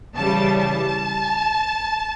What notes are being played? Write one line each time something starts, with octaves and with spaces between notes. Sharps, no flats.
C#3 E3 G3 A5
A5